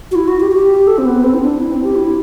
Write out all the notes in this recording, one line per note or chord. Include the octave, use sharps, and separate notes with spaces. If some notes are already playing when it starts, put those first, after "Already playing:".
F#4
E4
F#4
G4
G4
A4
C4
B3
C4
E4
D4
E4
C4
G4
E4